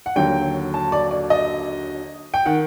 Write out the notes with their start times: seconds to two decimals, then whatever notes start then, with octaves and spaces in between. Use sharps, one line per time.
0.06 F#5
0.16 D#2 D3 F#3 G5
0.74 A5
0.92 D5
1.11 D5
1.30 D#5
2.34 G5
2.46 D#3 F#5